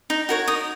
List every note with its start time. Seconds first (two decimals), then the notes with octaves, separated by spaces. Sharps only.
0.10 D#4
0.29 F#4 A#4 C#5
0.48 D#4 D#6